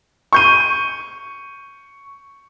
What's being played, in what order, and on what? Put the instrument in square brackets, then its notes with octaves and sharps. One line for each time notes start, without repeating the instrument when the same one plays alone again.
[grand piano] C#6 G6 D#7